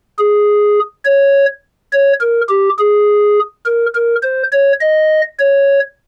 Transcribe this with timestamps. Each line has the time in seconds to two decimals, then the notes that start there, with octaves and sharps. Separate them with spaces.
0.18 G#4
1.05 C#5
1.92 C#5
2.20 A#4
2.49 G4
2.78 G#4
3.65 A#4
3.95 A#4
4.23 C5
4.52 C#5
4.81 D#5
5.39 C#5